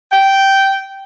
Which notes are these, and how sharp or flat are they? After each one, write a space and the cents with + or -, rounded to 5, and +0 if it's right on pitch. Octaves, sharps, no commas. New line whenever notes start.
G5 -10